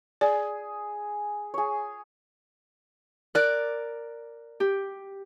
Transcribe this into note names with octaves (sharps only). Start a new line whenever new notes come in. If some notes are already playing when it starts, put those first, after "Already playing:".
G#4 D5
G#4 C#5
A#4 D5 F#6
G4